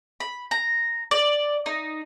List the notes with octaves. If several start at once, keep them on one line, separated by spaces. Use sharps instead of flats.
B5
A#5
D5
D#4